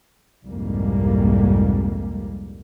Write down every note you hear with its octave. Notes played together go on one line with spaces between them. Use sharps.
C2 F2 G#2 G3 G#3 A#3